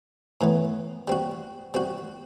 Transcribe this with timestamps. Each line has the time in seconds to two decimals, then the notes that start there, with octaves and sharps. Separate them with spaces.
0.41 A2 E3 B3
1.08 G3 C4 F#4
1.74 G3 C4 F#4